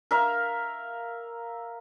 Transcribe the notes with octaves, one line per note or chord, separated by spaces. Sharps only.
A#4 E5 F5